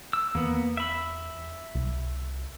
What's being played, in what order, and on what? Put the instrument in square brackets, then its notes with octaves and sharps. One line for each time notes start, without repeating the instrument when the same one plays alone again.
[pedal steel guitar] E6
[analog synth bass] E2 [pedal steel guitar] A#3 B3
[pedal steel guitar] E5 B5
[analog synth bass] C2